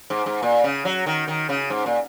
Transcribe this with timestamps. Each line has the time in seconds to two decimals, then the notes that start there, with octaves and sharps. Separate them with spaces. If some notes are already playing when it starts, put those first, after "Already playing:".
0.10 G#2
0.26 G#2
0.42 A#2
0.64 C#3
0.85 F#3
1.06 D#3
1.28 D#3
1.49 C#3
1.70 G#2
1.86 A#2